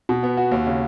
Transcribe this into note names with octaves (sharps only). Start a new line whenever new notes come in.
B2
B3
F#4
D#2
C#3